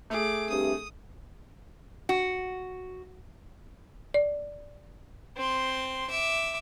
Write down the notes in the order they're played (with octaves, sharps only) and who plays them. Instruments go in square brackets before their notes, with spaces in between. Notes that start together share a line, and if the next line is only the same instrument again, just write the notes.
[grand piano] A3 G#4 [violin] D6
[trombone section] G2 C3 [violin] D#6
[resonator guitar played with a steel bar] F#4
[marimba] D5
[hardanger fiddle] C4 C6
E5 D6